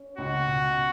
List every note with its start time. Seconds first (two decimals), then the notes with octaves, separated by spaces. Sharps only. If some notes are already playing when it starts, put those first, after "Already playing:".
Already playing: C#4
0.18 C#2 F#4
0.47 B2